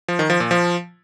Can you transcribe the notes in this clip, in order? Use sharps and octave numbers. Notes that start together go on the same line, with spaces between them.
F3
D#3
F3
A#2
F3